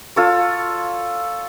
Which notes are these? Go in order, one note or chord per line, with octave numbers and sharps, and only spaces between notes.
F4 A4 C#5